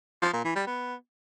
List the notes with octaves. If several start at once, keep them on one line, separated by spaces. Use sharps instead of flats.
F3
A#2
E3
G3
B3